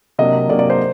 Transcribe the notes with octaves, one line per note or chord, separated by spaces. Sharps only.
C3 F#3 A#3 D4 D#5
C3 F#3 A#3 D4 D5
D5
C5